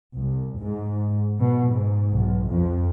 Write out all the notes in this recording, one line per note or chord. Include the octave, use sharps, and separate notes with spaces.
C2
G#2
B2
G#2
B1
F2